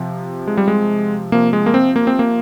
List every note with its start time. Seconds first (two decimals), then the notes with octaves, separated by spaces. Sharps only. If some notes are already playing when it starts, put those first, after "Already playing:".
Already playing: C3 F3
0.47 G#3
0.57 G3
0.68 G#3
1.32 C3 F3 A#3
1.53 G#3
1.66 A#3
1.74 C4
1.96 A#3
2.07 C4
2.19 A#3